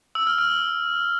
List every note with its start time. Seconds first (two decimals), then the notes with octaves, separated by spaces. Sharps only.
0.15 E6
0.27 F6
0.38 F6